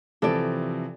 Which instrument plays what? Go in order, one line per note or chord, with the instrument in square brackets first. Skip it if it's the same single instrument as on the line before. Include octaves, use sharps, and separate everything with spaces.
[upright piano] C3 E3 F3 [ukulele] A4 D5